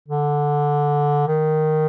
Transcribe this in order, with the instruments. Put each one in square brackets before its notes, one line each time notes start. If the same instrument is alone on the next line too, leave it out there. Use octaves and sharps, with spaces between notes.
[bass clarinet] D3
D#3